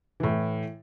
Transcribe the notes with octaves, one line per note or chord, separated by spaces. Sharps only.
A2 E3